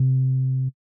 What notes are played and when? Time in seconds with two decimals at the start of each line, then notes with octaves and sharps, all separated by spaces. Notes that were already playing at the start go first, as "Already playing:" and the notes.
Already playing: C3